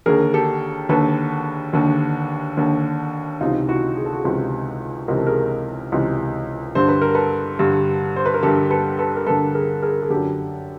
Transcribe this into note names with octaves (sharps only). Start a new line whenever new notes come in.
D#2 D3 G#4 A#4
G4 A4
D#2 D3 A4 B4
D#2 D3
D#2 D3
C#2 C3 E3 D#4 F4
E4 F#4
G#4
A4
F#4 G#4
C#2 C3 E3
C#2 C3 E3 A#4
A4
G#4 A#4
C#2 C3 E3
G2 D3 C5
B4
A#4
A4 B4
G2 D3
C5
B4
A#4
G2 D3 G4 A4
A4 B4
A4 B4
A#4
G2 D3 A4 B4
G#4 A#4
G#4 A#4
G#4
F#2 D3 G4 A4